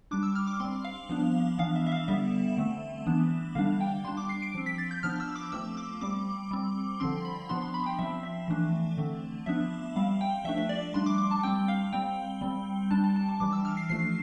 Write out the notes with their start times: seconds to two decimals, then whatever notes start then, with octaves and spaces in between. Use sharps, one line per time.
0.11 G3 D4 D6
0.23 E6
0.35 F6
0.47 D6
0.60 G3 C4 C6
0.84 F5
1.09 F3 B3 D4
1.58 E3 B3 D4 F5
1.75 E5
1.87 E5
1.92 F5
2.08 D3 G3 B3 E5
2.57 D3 A3 C4
3.06 E3 B3 D4
3.55 D3 G3 D4 F5
3.81 G5
4.05 G3 D4 C6
4.17 D6
4.29 C7
4.42 D7
4.54 F3 C4
4.66 B6
4.78 A6
4.91 G6
5.03 F3 B3 D4 F6
5.20 E6
5.35 D6
5.52 F3 A3 C4 E6
5.77 D6
6.01 G3 C4 D6
6.51 G3 C4
7.00 D3 F3 C4 C6
7.25 B5
7.49 F3 B3 D4 C6
7.62 C6
7.74 B5
7.86 G5
7.99 F3 C4 E5
8.23 E5
8.48 E3 A3 D4
8.97 D3 A3 C4
9.46 F3 B3 D4 E5
9.96 G3 C4 F5
10.21 G5
10.44 F3 A3 D4 E5
10.58 E5
10.69 D5
10.94 G3 D4 C6
11.06 D6
11.18 D6
11.31 A5
11.43 G3 C4 G5
11.68 F5
11.93 G3 C4 G5
12.41 G3 C4
12.91 G3 D4 A5
13.04 A5
13.16 A5
13.29 A5
13.40 E3 G3 D4 D6
13.53 E6
13.65 F6
13.77 C7
13.89 F3 A3 D4 C7